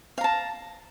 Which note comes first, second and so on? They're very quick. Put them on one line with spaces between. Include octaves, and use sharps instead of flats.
F5 A#5 A5